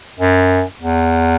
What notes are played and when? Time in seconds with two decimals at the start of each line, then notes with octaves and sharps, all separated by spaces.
0.19 F#2
0.82 E2